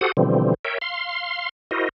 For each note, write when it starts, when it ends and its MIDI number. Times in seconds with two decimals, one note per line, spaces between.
0.01 0.12 66
0.01 0.12 67
0.01 0.12 69
0.01 0.12 72
0.01 0.12 78
0.01 0.12 87
0.17 0.54 47
0.17 0.54 50
0.17 0.54 52
0.17 0.54 53
0.17 0.54 55
0.17 0.54 60
0.65 0.78 70
0.65 0.78 73
0.65 0.78 76
0.65 0.78 79
0.81 1.49 77
0.81 1.49 84
1.71 1.89 64
1.71 1.89 66
1.71 1.89 70
1.71 1.89 72
1.71 1.89 75